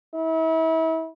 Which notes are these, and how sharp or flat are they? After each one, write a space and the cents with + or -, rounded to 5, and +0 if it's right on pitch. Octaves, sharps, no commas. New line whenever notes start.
E4 -35